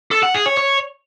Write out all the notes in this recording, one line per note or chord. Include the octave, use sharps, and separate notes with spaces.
A4
F#5
G#4
C#5
C#5